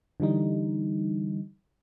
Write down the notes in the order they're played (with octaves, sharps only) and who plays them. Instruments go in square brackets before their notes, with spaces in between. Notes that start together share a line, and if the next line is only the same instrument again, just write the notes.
[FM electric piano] D3 E3 G3 D#4